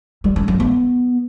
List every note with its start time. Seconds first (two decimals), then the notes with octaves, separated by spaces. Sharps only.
0.24 G3
0.36 C#4
0.48 F#3
0.60 B3